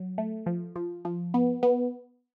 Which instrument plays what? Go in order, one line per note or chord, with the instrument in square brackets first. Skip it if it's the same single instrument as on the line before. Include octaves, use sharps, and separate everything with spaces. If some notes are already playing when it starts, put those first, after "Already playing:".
Already playing: [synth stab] F#3
A3
F3
F3
F3
B3
B3